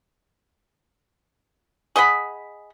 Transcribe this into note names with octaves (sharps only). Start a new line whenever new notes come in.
G#4 D#5 F#5 B5